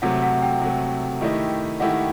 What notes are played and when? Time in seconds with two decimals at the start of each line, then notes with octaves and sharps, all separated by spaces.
0.02 C3 F#3 A3 F#5
0.22 F#5
0.42 G5
0.62 C3 F#3 A3
1.21 D#3 A3 E4 G4 D#5
1.80 D#3 A3 E4 G4 D#5 F#5